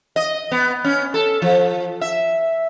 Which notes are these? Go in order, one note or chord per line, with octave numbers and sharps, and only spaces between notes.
D#5
B3
C#4
A4
F3
E5